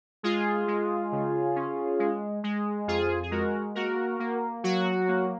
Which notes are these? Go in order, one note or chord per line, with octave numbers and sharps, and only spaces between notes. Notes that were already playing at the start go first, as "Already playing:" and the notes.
G#3 F4 G#4
G#3
C#3
C#4
G#3
G#3
F2 F4 G#4
G#4
G#3 F#4 A#4
A#3 F#4 A#4
A#3
F#3 F#4
A#3